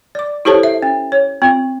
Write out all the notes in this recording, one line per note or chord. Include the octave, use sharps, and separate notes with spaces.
D5 D6
E4 G4 A4 C5 C#5 A5
E5
C#4
C#5
C4 F4